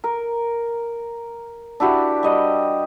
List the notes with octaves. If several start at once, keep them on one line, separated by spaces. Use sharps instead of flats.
A#4
D4 E4 F#4 G4
G3 D#5